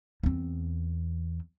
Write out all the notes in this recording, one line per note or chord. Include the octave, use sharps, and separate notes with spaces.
E2 C4